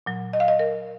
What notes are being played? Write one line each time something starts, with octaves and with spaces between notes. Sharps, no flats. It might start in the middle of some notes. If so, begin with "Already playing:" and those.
A#2 F#3
D#5
F5
D#5
A#4